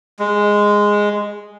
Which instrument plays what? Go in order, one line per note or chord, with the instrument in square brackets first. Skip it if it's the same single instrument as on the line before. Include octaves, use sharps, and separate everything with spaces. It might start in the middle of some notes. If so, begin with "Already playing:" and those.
[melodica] G#3